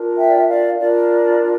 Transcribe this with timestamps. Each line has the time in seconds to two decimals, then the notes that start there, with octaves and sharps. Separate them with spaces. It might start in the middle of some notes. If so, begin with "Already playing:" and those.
Already playing: D4 F4 A#4
0.17 E5 G5
0.29 D5
0.38 E5
0.48 D5 F5
0.79 D4 F4 A#4 D5